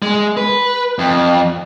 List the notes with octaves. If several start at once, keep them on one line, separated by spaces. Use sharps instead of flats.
G#3
B4
F2